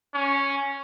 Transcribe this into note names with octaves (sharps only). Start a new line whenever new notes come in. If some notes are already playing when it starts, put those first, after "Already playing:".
C#4